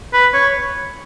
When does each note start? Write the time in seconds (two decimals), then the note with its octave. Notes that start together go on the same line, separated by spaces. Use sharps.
0.13 B4
0.34 C#5